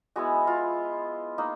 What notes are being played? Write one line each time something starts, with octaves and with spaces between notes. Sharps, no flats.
G#3 B3 E4 F#4
F4
A#3 D#4